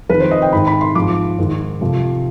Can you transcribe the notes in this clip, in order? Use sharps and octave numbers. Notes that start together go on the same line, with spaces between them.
F2 D#3 B4
C5
D#5
G5
G#2 D#3 B5
B5
C6
G#2 F3 D6
G#2 D#3
F2 C3 F3